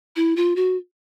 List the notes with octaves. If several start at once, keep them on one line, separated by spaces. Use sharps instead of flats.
E4
F4
F#4